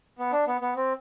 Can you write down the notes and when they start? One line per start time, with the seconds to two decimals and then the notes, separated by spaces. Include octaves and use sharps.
0.19 B3
0.32 D4
0.47 B3
0.61 B3
0.76 C4